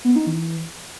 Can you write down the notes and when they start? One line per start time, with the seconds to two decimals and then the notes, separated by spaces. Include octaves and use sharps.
0.05 B3
0.16 D#4
0.27 E3